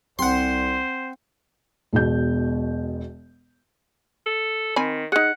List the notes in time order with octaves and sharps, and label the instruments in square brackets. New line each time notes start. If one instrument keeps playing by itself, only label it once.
[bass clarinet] C2 [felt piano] C4 [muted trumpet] C5 [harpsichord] F#5 C6
[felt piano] E1 B2 G6
[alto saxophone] A4
[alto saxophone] D#3 [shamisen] C4 G#5 B5
[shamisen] D#4 G#4 [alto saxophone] F#5